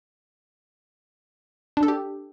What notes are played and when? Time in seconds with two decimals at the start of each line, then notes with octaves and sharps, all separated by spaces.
1.77 D4
1.83 A4
1.88 G4